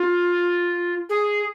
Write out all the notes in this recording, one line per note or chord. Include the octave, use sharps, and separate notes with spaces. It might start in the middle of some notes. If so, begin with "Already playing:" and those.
Already playing: F4
G#4